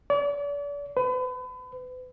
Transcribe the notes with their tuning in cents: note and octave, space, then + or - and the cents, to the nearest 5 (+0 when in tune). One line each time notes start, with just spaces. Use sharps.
D5 -40
B4 +35